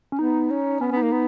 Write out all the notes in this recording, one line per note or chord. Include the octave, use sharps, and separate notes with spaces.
C#4
B3 D#4
C#4
B3 C#4
B3
D#4
A#3
B3